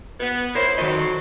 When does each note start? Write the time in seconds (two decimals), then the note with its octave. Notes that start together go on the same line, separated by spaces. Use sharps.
0.20 B3
0.55 E4 A#4 C5 C#5 E5
0.78 F2 D#3 F#3 D5 D#5